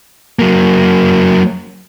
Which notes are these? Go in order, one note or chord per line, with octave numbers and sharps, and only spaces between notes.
F#3 A#3